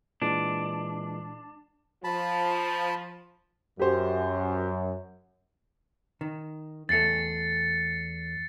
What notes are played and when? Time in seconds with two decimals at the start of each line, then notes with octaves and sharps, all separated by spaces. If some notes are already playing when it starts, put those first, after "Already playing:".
0.22 A#2 E3 G#3 D4
2.04 F3 A5 B5
3.80 F#2 G4 C5
6.21 D#3
6.89 E2 A3 A6 C7 C#7